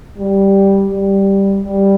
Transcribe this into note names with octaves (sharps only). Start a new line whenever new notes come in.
G3
G3
G3